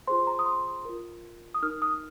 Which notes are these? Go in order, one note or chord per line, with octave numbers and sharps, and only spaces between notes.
F4 G#4 C5 C6
A#5
D#6
C6
F4 A#4
D#6
D#4 A#4 F6
D#6